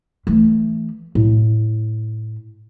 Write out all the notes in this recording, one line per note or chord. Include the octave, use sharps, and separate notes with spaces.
E3 A3
A2